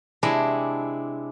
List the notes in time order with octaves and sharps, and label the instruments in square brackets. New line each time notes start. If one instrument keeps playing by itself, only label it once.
[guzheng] C3 G#3 D4 E4